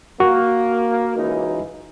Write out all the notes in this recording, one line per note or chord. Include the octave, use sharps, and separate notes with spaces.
A#3 F#4
C#2 E3 D#4